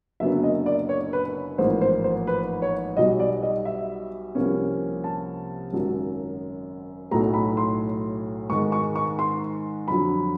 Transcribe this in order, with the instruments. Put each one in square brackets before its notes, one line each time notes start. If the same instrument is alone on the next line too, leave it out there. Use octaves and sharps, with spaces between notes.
[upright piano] F#1 F#2 D3 F#3 B3 E5
D#5
D5
C#5
B4
A1 G#2 F3 A#3 C5
C5
C5
B4
C#5
B1 B2 G3 D#5
D5
D#5
E5
C2 C3 F3 A#3 C#4
A5
G#1 F#2 C#3 F#3
B1 A2 F#3 A3 A#5
B5
C6
G#2 D#3 G#3 C#6
C#6
C#6
C6
F2 D3 F#3 B5